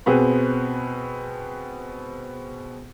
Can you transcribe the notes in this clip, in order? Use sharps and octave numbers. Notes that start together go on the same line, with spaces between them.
B2 B3 C4 G#4